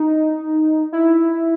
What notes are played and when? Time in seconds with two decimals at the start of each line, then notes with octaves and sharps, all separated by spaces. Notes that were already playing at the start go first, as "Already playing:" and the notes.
Already playing: D#4
0.92 E4